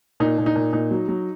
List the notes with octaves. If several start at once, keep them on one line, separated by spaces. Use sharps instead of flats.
A#2 D#4
A#2
D#4
A#2
A#2 D#4
F#3
F#3